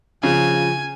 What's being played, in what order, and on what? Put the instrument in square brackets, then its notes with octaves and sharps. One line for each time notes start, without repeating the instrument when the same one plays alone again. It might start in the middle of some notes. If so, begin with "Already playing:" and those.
[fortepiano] C#3 [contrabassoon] F3 [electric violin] G#5